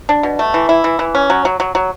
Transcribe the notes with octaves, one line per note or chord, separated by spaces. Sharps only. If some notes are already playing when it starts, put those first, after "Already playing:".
D4
B2
A3
E3
E4
E3
E3
C#4
F#3
F#3
F#3
F#3